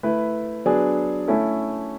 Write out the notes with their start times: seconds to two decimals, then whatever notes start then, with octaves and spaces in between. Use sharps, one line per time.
0.03 A3 E4 B4
0.66 F#3 B3 D4 G#4
1.28 A3 C#4 E4 A4